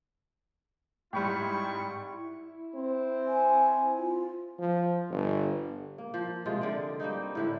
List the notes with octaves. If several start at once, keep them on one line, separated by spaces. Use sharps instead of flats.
G#2 G3 C4 E4 G5 B5 C#6
E4
C4
G#5
F4
F3
G1
A#3
F3
C3 G#3 F4
D3 D5
G3 A#3 C4 D#4
A2 D3 E4